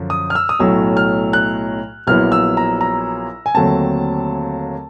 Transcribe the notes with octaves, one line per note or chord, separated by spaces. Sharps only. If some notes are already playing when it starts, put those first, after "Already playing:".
Already playing: F#2 D3 F3
D#6
F6
E6
D#6
B1 A2 F#3 A3 E6
F6
F#6
A#1 A#2 F#3 B3 E4 F6
E6
A#5
A#5
G#5
D#2 D3 F#3 A3 C4 A5